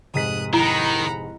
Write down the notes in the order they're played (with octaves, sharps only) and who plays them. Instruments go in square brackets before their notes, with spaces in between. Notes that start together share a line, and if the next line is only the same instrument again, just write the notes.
[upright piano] F1 G#2 B6 [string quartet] D#6 F#6
[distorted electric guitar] D#3 [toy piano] E4 [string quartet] F#5 A#5 B5